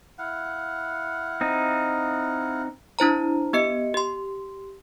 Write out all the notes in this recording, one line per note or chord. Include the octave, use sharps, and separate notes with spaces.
E4 F5 F#5
C4 D#4
D4 E4 C5 A#5
B3 G4 D#5 C#7
G4 C6